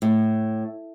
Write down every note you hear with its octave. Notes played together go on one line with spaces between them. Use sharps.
A2